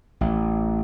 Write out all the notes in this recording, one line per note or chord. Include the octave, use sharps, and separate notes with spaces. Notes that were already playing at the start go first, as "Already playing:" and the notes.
A1